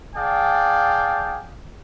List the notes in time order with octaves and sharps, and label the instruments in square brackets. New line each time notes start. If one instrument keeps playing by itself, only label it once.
[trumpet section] G#4 D5 F5 G5 A5